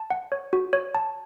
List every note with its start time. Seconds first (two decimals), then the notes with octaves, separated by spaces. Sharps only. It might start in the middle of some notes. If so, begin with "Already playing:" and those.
Already playing: A5
0.10 F#5
0.32 C#5
0.53 F#4
0.73 C#5
0.95 A5